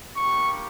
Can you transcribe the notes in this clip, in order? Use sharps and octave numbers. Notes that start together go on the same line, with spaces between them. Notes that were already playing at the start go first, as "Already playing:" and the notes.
G3 A#3 D4 G4 C#6